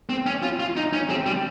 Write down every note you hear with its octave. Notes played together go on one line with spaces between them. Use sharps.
C4
C#4
F4
F4
D#4
C#4
C4
G3